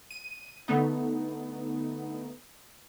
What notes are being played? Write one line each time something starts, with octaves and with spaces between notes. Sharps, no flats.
D#7
D3 A3 B3 D#4